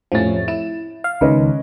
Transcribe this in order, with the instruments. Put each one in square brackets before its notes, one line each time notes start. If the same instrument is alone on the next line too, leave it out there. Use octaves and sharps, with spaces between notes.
[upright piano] F1 A2 A6 [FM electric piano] F3 C#4
[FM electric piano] E4 [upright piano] E7
[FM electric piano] F5
[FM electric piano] C#2 D#3 [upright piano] C#4 B4 D#5